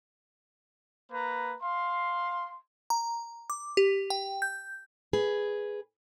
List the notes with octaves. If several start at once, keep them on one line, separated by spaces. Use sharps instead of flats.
A#3 B4 A#5
F5 C6
A#5
D6
G4
G5
G6
G#4 B4